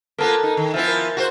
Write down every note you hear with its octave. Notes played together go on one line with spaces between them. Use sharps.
A#3 B3 F4 A4 A#4 A5
D#4
D#3
F3 B3 E4 E5 G#5
A#4
F#4 G4 C5